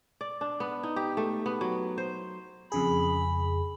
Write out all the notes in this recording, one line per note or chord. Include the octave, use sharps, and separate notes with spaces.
D5
D4
B3
D#4
G4
A3
B3
F#3
C5
F2 C#3 G#4 B5